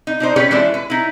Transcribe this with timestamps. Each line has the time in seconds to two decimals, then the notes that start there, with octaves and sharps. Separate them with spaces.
0.07 D#4
0.20 D4 D#4 C5
0.36 C#4 G4 G#4 B4 C#5
0.51 E3 G#3 C#4 E4 A4 D5
0.74 B4
0.90 D#4 E4